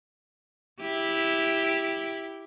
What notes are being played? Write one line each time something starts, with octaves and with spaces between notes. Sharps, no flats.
E4 G4